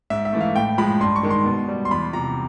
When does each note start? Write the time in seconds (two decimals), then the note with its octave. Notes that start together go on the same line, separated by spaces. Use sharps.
0.10 G#2 E5
0.25 E5
0.33 E3 A3
0.41 F5
0.56 A2 G5
0.78 F3 G#3 B5
1.00 G2 C6
1.16 C#6
1.23 D#3 G#3
1.30 C6
1.46 B2
1.68 G3
1.85 C6
1.91 E2 B5
2.13 C3 F3 A#5